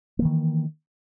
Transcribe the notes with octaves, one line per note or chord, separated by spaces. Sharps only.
D#3 E3 A#3